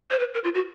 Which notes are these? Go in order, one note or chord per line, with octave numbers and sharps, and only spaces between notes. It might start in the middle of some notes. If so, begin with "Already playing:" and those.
C5
B4
A#4
F4
F#4